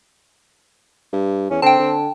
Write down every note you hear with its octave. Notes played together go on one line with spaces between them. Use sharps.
G2
E2 C#4
D3 C4 G5 A5
D3